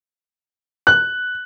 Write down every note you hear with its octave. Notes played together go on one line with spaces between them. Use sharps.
F#6